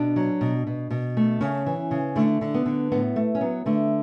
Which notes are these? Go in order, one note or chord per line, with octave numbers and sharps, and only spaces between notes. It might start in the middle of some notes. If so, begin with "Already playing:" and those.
Already playing: B2 D4
F#3
B2
B2
B2
A3
C#3 C#4
E3
C#3
D3 A3
D3
B3
D3
A2 B3
A3
C#4
F#3 B3
D3 A3